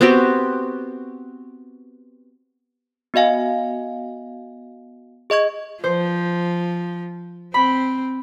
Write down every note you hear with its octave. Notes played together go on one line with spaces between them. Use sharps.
B3 C4 F#4 G4
B3 F#4 D#5 F5 G#5
G#4 D#5 C#6 G#6
F3 C5
C4 B5